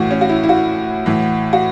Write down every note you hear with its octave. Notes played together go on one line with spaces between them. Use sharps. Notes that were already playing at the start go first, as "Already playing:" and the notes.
Already playing: A2 E3 F#4
C#4
F#4
E4
E4
F#4
A2 E3
F#4